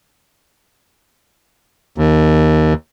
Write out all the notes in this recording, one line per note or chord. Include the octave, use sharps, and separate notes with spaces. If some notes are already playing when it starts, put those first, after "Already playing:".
D#2